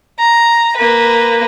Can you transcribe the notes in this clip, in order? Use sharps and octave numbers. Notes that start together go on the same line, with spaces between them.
A#5
A#3 B4